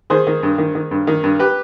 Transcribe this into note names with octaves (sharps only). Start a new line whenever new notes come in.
D#3 G#4 C5
D#3
G2
D#3
D#3
G2
D#3
G2
G4 B4